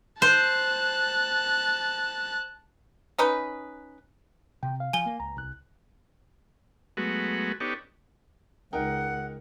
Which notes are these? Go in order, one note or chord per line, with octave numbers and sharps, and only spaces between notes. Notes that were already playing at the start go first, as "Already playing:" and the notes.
C5 A5 F#6
C#4 D#4 B4
C3 G5
F5
F3 G#5 G7
A#3
C#2 A#5
C2 F#6
F#3 G#3 A3 B3 F#4
B3 D4 D#4 G4 A4 C#5
C#2 D#4 A#4 F#5 G5